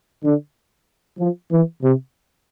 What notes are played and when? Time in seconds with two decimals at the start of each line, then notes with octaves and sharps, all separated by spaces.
0.24 D3
1.18 F3
1.51 E3
1.82 C3